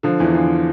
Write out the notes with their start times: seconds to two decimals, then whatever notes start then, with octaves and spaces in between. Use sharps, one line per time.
0.03 D3 F3
0.20 E2 E3
0.34 D3 F3